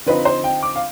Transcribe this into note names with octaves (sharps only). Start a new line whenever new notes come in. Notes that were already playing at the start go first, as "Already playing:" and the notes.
D3 F3 C4 D#4 B4
C5
G5
D6
F5